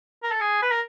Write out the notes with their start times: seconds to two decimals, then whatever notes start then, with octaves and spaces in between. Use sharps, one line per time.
0.23 A#4
0.31 A4
0.41 G#4
0.62 B4
0.71 A#4